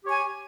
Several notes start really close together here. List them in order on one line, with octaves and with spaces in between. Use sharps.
G4 C#5 G#5